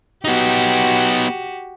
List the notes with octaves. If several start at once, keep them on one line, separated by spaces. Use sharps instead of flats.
B3 D#4 F#4 G4